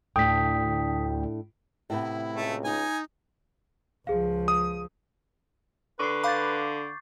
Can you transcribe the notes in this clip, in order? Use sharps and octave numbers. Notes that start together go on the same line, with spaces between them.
D2 A2 D4 G5 D#6 B6
A2 C3 B3 E4
C#2 A3
D#4 G#5
C#2 F3 G#4 F5
D#6
D3 B4 C#6 C7
F5 B5 D6 G6 A6